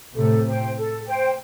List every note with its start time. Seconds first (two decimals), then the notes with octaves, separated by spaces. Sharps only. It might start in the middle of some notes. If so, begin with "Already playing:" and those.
0.15 A2 C3 A4
0.46 C5 G5
0.76 A4
1.06 C5 G5